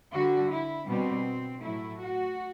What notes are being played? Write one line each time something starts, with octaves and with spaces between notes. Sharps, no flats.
D3 G3 F#4
E4
B2 G3 C4
A2 F#3 A3 E4
F#4